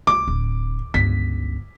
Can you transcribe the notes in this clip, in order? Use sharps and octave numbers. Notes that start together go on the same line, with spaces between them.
C2 D6
D1
G1 C#2 B6